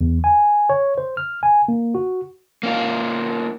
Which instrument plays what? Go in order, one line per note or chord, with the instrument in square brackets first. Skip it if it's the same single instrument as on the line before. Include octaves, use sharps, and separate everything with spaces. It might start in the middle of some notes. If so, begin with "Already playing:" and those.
[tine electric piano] E2
G#5
C#5
C5
F6
G#5
A#3
F#4
[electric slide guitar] A#3 C#4 F4